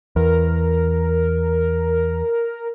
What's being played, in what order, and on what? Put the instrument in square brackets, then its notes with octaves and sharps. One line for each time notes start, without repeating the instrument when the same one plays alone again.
[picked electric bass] E2 [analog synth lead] A#4